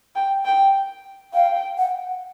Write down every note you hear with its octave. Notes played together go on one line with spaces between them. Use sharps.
G5
G5
F5 G5
F#5